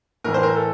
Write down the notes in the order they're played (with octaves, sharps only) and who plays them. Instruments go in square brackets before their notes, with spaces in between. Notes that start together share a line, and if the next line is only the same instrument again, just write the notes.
[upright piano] A2 E3 A#4
C5
A#4
A4